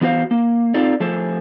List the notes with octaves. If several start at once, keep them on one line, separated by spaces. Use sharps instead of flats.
E3 B3 F#4 C5 F5
A#3
C4 D#4 F4 A4 D5
F3 A3 G#4 A4 C5